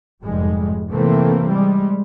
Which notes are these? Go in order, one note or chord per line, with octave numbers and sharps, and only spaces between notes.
F1 F2 G#2 G3 G#3
C3 E3 A3 A#3 C4
G3 G#3